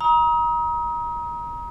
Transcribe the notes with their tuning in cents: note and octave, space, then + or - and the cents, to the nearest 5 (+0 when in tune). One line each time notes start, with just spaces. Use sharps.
A#5 +30 D#6 +35